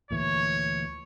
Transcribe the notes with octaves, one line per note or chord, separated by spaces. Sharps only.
D2 A#2 E3 C#5